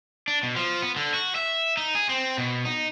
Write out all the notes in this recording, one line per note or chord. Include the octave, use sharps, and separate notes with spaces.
D4
B2
F3
B3
D3
F#4
E5
D#4
G#4
C4
B2
D#4